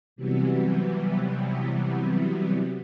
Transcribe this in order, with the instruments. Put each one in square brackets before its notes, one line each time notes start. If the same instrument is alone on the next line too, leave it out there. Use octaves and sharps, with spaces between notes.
[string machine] C3 E3 F#3 G3 B3